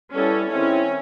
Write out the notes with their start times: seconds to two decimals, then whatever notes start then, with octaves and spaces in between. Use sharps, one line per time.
0.13 G3 B3 C#4 E4 A4
0.49 D#3 G#3 C4 C#4 E4